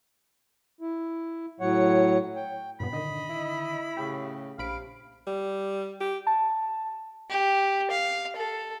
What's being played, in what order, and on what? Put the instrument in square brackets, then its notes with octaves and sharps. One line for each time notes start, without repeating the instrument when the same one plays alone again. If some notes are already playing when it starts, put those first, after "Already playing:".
[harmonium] E4
A2 F#3 C#5 F#5
G5
[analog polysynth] G2 A#2 B3 [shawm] B5
[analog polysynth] D3 D#3 [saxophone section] D#5
[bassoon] E4
[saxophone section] A2 C#3 [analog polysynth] G4
[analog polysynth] A#1 B5 D7 [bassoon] C3 [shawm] F5
[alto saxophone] G3
G4
[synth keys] A5
[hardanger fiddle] G4
F5
A4